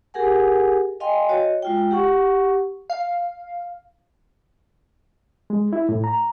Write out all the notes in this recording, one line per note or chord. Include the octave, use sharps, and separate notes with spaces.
G4 G#4 A#4 F#5 G#5
D#5 F5 G5 G#5 C6
F#4 C#5 D#5
G#3 F4 G5
G4 F#5 C#6
F5
G#3
E4
A2
A#5